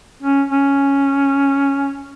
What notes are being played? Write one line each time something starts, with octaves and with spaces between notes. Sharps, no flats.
C#4
C#4